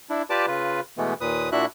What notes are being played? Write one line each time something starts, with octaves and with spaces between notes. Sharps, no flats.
D4 E4
F4 G4 B4 D5 A5 D6
C#3 F4 B4
B2 E3 G#3 A3 B3
D#2 A#2 B4 D#6
A#2 D4 E4 F#4 E5 F#6